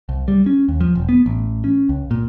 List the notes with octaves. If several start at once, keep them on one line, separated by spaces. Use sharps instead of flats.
C2
G3
C#4
D#2
F3
E1
B3
A1
C#4
C#2
A#2